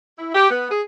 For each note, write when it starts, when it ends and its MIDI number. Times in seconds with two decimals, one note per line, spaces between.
0.19 0.32 64
0.35 0.50 67
0.51 0.70 59
0.70 0.82 68